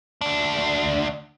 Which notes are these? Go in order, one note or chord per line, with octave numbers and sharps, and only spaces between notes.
D2 D4